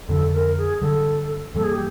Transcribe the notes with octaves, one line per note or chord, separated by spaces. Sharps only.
F2 D3 F#3 B3 A4
A#4
G#4
G2 D3 F#3 A4
G2 E3 G3 A#3 A4
G#4
G4